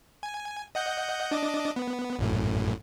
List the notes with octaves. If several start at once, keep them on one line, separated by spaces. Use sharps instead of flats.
G#5
D#5 F#5 G6
D4 D#5 D6
B3
A1 F#2 A2